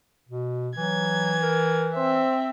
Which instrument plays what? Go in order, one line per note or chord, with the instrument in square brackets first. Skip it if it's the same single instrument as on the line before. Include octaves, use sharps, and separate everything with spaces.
[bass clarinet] B2
[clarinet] E3 [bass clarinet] F#3 [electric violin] G#6
[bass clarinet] A#4
[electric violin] C4 E5 [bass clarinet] C5